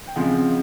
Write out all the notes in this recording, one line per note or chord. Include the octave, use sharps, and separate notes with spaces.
G5
C#3 F3 G#3 C4 F#5